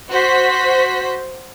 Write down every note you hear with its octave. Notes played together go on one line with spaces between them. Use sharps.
F#4 C5 B6